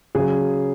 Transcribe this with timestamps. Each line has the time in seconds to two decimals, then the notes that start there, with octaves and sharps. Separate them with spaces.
0.15 C#3 F#3 G#4